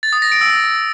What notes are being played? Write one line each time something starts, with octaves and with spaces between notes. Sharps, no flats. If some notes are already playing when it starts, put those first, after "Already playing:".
A6
D#6
A#6
D7
E6